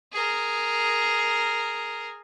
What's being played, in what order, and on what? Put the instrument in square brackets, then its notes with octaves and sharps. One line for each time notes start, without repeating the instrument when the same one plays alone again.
[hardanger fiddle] G#4 A#4